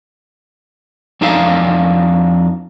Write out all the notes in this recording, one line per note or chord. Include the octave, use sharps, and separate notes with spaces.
F2 D4 D#4 A4 F5